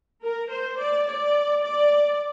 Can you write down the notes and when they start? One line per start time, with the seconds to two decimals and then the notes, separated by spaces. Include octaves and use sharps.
0.22 A#4
0.50 C5
0.79 D5
1.06 D5
1.63 D5